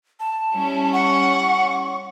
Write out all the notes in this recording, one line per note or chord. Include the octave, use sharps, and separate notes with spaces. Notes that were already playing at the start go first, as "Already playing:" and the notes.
A5
G3 C#4 E4
F#5 C#6